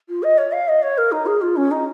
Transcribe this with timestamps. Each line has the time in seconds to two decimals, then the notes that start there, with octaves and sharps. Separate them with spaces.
0.09 F4
0.23 D#5
0.38 C#5
0.52 F5
0.68 D#5
0.82 C#5
0.98 A#4
1.12 D#4
1.26 G#4
1.42 F4
1.56 C#4
1.71 D#4